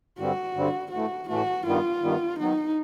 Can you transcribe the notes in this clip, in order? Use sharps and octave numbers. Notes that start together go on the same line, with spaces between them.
G2 D3 G3 C4 F#4
G2 D3 G3 C4
A2 E3 A3 F#4
A2 E3 A3 F#4
G2 D#3 G3 B3 F4
G2 D#3 G3 B3
D#3 F#3 B3 D#4